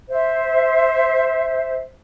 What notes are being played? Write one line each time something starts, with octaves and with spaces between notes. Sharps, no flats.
C5 E5